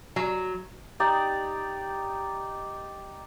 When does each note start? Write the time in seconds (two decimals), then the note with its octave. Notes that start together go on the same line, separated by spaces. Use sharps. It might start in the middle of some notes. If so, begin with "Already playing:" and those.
0.16 F#3
1.00 D#4 G4 D5 A#5